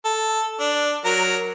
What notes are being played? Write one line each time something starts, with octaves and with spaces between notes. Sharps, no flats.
A4
D4
F#3 A#4 A#5